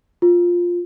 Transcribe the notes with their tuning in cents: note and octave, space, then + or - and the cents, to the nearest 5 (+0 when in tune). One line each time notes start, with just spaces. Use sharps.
F4 +5